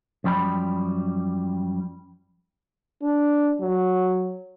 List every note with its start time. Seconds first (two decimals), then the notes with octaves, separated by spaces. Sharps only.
0.24 F#2 F3 G3 G5 B5
3.02 D4
3.60 F#3